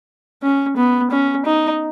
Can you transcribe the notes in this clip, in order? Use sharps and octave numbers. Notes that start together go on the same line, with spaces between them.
C#4
B3
C#4
D#4